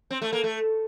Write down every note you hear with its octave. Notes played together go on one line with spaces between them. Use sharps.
C4
A3
A#3
A3